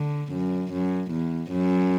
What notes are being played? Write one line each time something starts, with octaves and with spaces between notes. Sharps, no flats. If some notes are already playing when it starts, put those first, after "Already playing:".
Already playing: D3
F#2
F#2
E2
F#2